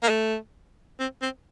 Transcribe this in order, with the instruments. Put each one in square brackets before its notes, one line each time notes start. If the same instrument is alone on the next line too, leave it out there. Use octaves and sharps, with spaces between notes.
[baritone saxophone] A#3
A3
C4
C4